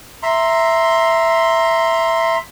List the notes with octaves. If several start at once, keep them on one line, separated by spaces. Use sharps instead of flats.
E5 A#5 C6